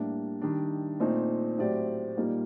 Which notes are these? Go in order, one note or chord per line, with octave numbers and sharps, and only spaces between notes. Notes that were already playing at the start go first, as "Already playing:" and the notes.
Already playing: A2 G3 A#3 D4 G4
D#3 G3 D4
A#2 A3 C4 D#4
A2 F#3 C4 G4 D5
A#2 G3 A#3 D#4 G4